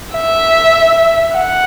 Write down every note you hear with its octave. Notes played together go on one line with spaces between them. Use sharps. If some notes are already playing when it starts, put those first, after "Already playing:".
E5
F#5